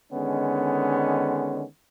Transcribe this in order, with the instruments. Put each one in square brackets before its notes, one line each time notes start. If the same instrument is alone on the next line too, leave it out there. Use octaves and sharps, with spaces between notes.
[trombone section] D3 D#3 G#3 B3 C#4